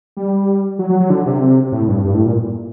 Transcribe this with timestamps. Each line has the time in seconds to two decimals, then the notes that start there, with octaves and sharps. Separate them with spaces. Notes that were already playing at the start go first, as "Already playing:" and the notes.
0.17 G3
0.79 F#3
0.90 F#3
1.00 F#3
1.10 D3
1.26 C3
1.72 A2
1.88 G2
2.04 G2
2.14 A2
2.25 A#2